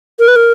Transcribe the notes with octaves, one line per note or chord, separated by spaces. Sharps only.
A#4
B4
A#4